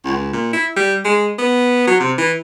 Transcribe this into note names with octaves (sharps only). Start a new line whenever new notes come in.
C#2
A#2
E4
G3
G#3
B3
F#3
C3
E3